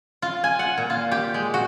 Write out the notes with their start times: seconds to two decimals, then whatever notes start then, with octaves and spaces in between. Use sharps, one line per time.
0.22 F4
0.44 G#5
0.59 F#5
0.78 A#2
0.90 F4
1.11 G4
1.34 G#3
1.54 F#4